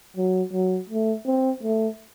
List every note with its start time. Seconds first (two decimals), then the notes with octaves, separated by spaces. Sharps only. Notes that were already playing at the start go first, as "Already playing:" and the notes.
0.17 F#3
0.53 F#3
0.89 A3
1.26 C4
1.63 A3